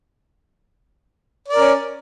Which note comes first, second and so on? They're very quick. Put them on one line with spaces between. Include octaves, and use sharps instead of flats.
D5 A#4 C#4